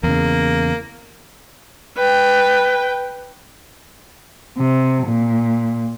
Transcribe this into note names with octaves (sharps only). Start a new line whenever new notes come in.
E2 C#3 A#3
B4 G5
C3
A#2